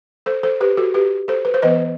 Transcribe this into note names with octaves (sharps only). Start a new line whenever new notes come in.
A4 C5
A4 C5
G4 B4
F#4 A4
G4 B4
A4 C5
B4
C5
E3 B3 B4 D#5